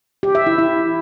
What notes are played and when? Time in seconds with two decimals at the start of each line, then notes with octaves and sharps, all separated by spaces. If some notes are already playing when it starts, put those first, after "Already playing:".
0.23 G4
0.35 E5
0.47 E4
0.58 E4